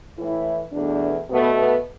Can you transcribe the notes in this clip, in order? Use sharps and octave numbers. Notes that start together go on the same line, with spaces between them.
A2 E3 A3 E4
E2 B2 A3 D4
B2 A3 B3
B3